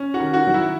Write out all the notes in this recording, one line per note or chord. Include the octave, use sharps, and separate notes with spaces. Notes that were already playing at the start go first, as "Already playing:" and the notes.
Already playing: C#4
F#4 F#5
D#3
F#4 F#5
F#3
E4 E5